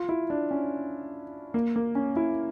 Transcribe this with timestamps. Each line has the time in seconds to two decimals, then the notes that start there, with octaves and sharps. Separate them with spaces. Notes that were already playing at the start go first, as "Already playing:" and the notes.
Already playing: F4
0.09 E4
0.30 D4
0.51 C#4
1.54 A#3
1.76 A#3
1.95 C#4
2.16 E4